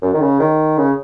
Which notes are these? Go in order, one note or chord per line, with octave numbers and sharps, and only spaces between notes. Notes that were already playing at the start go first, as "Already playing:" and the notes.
F#2
D#3
C#3
D#3
C#3